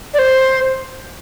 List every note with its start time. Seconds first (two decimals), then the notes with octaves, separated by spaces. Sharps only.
0.14 D5
0.19 C5